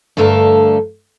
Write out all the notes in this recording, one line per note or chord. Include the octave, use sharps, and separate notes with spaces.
G2 D3 A3 A4 A#4 F5